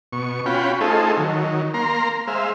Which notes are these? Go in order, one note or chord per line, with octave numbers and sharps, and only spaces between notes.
B2 C#6
C#4 F4 F#4 G5 B5
A3 D#4 F4 G#4 A4 C5
D#3 F#3
A#3 A#5 C6
G#3 C5 E5 F5